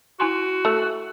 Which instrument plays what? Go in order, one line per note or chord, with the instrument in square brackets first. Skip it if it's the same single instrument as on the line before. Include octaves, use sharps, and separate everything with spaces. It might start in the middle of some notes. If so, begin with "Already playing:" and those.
[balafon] E4 G#5 C6 [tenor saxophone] F#4
[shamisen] A3